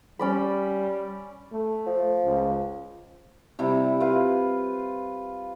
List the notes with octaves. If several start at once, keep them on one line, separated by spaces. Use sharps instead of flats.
G3 C#4 D5 B5
A3
F3
C#2
C3 G3 E4
F4 B4